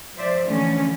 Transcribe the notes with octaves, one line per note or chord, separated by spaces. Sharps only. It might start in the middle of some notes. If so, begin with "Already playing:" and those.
F3 C5 D5 E5
D3 E3 F3 A3 C#4